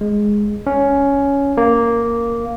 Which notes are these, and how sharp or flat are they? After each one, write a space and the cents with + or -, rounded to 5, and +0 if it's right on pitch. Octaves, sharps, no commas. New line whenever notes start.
G#3 +0
C#4 +10
A#3 +0